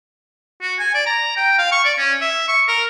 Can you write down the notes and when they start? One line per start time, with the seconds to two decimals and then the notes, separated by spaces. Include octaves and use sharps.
0.62 F#4
0.79 G#5
0.95 D5
1.06 A#5
1.37 G5
1.59 F5
1.72 C#6
1.85 D5
1.98 C#4
2.22 E5
2.48 C#6
2.68 A#4